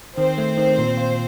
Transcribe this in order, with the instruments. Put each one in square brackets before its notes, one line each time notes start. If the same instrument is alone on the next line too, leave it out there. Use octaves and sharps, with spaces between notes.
[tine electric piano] D#3 [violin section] C4 C5
[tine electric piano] A3
D#3
A#2
F4